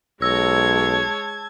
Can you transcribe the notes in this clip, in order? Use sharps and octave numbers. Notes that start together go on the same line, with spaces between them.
B1 G#3 C#5 A5 E6 G#6